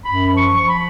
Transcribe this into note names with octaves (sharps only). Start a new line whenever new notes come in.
F#2 B5
F3
C#6
F3
C#6
B5